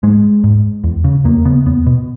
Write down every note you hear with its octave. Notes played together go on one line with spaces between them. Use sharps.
G#2 G#3
G#2
E2
C#3
E2 A#3
C#3 B3
E2 B3
B2